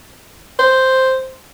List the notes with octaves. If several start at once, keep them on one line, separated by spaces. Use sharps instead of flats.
C5